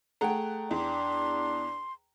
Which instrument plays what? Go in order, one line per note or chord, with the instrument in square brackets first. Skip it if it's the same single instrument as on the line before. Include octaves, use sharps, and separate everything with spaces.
[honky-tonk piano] A3 G#4 F#5 [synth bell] G5 A#5
[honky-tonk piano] E2 [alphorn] D4 [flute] C6